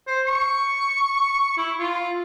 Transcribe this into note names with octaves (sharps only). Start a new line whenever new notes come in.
C5
C#6
E4
F4